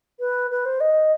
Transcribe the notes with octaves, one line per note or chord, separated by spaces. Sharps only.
B4
B4
C5
D#5